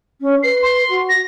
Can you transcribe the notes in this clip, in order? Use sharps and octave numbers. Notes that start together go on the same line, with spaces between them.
C#4
B4 C7
C6
F#4
A#6